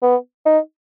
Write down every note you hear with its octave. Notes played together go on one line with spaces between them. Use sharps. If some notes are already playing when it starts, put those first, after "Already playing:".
B3
D#4